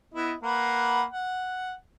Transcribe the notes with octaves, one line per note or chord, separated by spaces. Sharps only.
B3 E4 D#5
A#3 B4 F#5
F#5